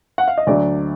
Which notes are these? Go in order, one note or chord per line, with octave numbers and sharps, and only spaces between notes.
F#5
F5
D#5
D2 D3 F#3 D5